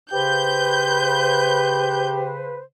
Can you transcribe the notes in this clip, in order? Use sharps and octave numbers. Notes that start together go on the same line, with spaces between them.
C#3 G4 B4 C5 G6